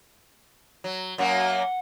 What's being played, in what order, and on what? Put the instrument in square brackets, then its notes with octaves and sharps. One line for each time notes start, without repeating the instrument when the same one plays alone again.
[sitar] F#3
[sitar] F#2 F#3 A#3 [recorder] F#5